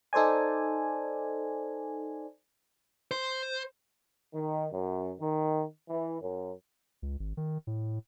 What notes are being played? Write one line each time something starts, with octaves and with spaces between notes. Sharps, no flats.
D#4 A4 C5 D5 G#5
C5
D#3
F#2
D#3
E3
F#2
C#2
G#1
D#3
A2